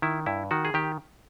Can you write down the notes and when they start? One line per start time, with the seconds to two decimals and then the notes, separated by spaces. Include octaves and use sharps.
0.02 D#3 E4
0.26 G2 E4
0.51 D#3 F#4
0.65 G#4
0.74 D#3 G4